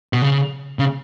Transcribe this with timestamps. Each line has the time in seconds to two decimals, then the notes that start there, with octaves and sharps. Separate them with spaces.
0.13 B2
0.22 C#3
0.79 C#3